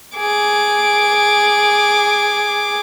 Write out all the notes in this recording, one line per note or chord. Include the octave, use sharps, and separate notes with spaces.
G#4 D6